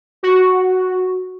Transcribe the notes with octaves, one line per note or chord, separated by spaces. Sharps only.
F#4